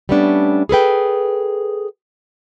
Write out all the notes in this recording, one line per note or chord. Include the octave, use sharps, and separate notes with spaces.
G3 A3 B3 C#4 D4
G#4 A4 B4 G5